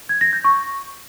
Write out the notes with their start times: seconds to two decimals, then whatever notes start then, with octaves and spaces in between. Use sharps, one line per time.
0.09 G#6
0.21 A#6
0.33 G6
0.44 C#6